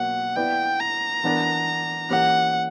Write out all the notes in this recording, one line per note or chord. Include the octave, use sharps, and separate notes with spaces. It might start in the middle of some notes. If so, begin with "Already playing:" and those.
Already playing: B2 F#3 A#3 F#5
B3 E4 B4 D5 G5
A#5
E3 B3 D4 A#4 D5
E3 A#3 C#4 G4 F#5